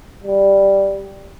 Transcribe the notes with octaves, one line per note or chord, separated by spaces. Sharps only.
G3